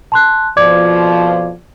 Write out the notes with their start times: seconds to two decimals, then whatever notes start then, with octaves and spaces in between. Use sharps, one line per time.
0.12 A5 C6 F#6
0.57 F2 B2 F3 D5 D6 G#6